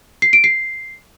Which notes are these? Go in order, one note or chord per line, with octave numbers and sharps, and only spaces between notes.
C7
D7
C7